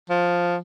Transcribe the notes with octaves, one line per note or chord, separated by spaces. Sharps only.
F3